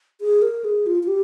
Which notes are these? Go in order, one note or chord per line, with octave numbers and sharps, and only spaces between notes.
G#4
A#4
G#4
F4
F4
G4